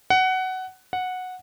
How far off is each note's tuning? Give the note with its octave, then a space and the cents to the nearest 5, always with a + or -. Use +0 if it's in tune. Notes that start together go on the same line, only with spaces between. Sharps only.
F#5 +15
F#5 -10